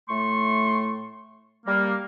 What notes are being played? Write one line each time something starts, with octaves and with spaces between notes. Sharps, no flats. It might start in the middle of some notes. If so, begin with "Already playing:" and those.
A2 A3 C6 C#6
G3 A#3